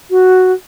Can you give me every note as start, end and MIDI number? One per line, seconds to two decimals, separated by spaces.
0.10 0.52 66